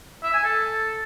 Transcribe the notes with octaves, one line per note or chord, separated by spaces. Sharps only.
E5
G#5
A4